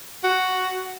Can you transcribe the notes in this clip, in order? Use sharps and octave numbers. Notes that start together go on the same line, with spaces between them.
F#4